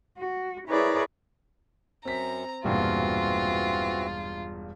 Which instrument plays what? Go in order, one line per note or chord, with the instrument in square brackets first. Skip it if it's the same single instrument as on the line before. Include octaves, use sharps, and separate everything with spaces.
[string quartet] F#4
E4 G#4 A#4 B4 C#5 D5
[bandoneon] F#2 [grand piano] C4 B6 [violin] A#5
[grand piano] E1 G2 A#2 [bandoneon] E3 C4 F#4 [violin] F4